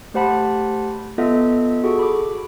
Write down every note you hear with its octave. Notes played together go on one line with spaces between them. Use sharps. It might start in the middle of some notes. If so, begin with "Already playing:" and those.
A3 G4 C5 F#5 A5 B5
B3 F4 A4 D#5 E5
F#4 G#4 A4 C#6
B5 D6